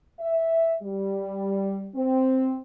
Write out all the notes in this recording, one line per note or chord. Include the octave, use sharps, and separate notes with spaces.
E5
G3
C4